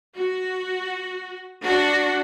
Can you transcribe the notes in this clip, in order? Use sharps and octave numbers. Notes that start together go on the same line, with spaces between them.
F#4
D4 F#4